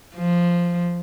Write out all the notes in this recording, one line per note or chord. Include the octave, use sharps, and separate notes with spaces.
F3